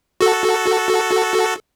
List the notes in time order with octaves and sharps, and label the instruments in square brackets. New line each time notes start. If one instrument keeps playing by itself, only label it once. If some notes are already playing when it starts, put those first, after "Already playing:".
[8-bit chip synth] F#4 A4